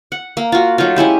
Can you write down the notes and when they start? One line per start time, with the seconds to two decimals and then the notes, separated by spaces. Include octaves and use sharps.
0.12 F#5
0.37 A#3
0.52 F4 F#4
0.78 F#3 A3 D#4 F4
0.96 G#3 C#4 E4 G4